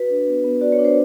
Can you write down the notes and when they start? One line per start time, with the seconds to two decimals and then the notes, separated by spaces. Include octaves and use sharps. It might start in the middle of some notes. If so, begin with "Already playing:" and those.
Already playing: F#4 B4
0.10 D4
0.27 B3
0.44 B3
0.61 F#4 D5
0.72 C#5
0.79 D4
0.85 C5